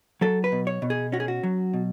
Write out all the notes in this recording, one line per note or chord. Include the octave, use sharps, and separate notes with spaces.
F#3 A4
B4
B2
C#5
B2
G#4
C#4 F#4
G#4
F#4
F#3
B2